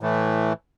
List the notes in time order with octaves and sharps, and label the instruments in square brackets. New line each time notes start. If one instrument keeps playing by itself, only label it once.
[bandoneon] A2 E3 A3